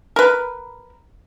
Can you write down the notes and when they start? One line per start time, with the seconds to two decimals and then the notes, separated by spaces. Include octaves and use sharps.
0.16 A#4 B4